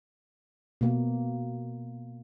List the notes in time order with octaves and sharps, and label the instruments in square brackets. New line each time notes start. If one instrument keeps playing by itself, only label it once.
[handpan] B2 A#3